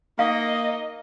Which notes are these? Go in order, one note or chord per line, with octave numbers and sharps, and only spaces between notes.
A#3 D#4 D#5 F5